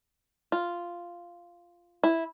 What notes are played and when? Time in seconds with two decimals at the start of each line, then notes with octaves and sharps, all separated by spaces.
0.52 F4
2.03 E4